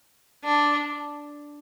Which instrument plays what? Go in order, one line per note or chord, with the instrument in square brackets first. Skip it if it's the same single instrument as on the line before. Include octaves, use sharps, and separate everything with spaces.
[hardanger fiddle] D4